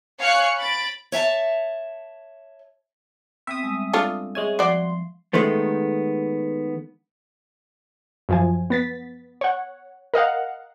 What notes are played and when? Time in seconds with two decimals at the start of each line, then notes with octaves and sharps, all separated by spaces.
0.18 C#5 F5 G#5 C#6 F#6 C#7
0.58 B5 A6 D7
1.12 C#5 E5 G5 A5
3.47 B3 C4 E5 G5 D#6
3.63 G3 G#3
3.93 D4 F4 A4
4.35 G#3 C#5 E5 G#5
4.59 F3 F#4 D5 C6
5.33 D#3 G#3 A3 B3
8.29 F#2 F3 G#5
8.70 B3 A6 B6
9.41 C#5 F#5
10.14 A#4 D#5 F5 F#5